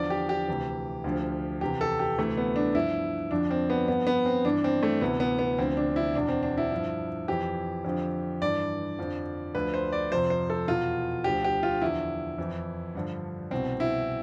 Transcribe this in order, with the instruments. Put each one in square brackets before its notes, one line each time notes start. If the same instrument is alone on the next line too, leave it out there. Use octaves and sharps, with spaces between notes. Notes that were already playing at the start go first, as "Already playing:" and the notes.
Already playing: [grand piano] E2 D3 F3 D5
G4
G4
D2 C3 E3
D2 D3 F3
E2 C3 E3 G4
A4
G4
D2 C3 E3 A3
B3
D4
G2 F3 E4
F2 D3 F3 D4
C4
B3
G2 F3 B3
B3
C4
G2 E3 D4
C4
A3
D2 C3 E3 B3
B3
B3
D2 D3 F3 C4
D4
E4
E2 B2 D4
C4
D4
E4
G2 F3
F2 E3 G4
F2 D3 F3
G2 E3 D5
F2 D3 F3
D2 D3 F3 B4
C5
D5
F2 C3 F3 C5
C5
A4
E2 B2 F4
D2 D3 F3 G4
G4
F4
E2 D3 F3 E4
F2 E3
G2 D3 F3
C2 B2 C4
E4